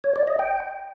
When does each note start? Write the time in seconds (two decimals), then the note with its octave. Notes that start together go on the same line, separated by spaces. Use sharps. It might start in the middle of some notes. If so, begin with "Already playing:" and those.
0.04 C#5
0.16 D5
0.27 D#5
0.39 G5